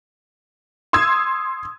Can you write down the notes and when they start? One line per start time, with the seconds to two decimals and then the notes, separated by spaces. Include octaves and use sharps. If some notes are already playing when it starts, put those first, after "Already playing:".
0.93 C6 D#6 E6 G#6